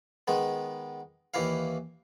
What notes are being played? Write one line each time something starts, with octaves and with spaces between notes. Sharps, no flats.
D#3 G#3 B3
D#2 E3 E4 F5